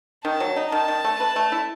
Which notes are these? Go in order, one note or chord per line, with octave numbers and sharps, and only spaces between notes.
D#3 A5
F#3
D#4
D#3 A5
D#3
A3
B4
A3
E4